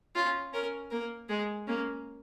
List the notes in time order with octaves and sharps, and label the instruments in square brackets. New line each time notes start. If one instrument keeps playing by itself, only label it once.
[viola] C#4 [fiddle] F4
[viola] C#4 [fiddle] A#4
[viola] A#3 [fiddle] A#4
[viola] G#3 [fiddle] G#4
[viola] A#3 [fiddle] C#4